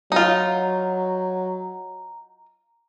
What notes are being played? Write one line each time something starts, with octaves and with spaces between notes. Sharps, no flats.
F#3 D#4 F4 A#5